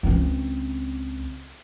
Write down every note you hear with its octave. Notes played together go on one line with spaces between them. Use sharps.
C#2 C4